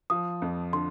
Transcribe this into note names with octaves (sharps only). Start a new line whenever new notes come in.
F3 D#6
F2
D3 C6